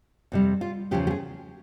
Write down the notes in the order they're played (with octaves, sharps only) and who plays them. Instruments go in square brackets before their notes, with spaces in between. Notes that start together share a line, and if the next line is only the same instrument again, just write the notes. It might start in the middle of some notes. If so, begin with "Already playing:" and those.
[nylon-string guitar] F2 C3 G3
F4
E2 C#3 F3 G4
G4
G#4